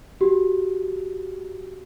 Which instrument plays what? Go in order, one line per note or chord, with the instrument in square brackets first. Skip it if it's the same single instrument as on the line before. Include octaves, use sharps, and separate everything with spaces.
[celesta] F#4 G4